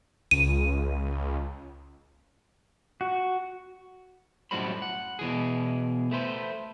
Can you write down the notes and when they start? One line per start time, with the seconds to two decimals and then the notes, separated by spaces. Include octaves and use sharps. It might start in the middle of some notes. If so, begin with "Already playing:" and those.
0.31 C#2 D#7
3.01 F#4
4.51 F#2 A2 G3 F#4 C5 B5
4.82 F#5
5.19 B2 E3 G#4
6.11 A3 B4 C5